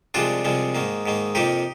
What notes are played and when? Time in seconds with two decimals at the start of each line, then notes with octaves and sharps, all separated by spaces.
0.14 C2 C3 F3 G#3 D4 F4
0.45 C2 C3 F3 G#3
0.75 G#2 D#3 A#3
1.06 G#2 D#3 A#3
1.35 F2 C3 F3 A#3 D#4 G4